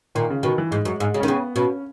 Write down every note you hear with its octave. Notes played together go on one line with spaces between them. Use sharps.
A#2 D#3
C#3
B2 D#3
E3
G#2 G#3
F#2
G#2 G#3
C#3
D#3 C#4
C#3 B3
B2 C#4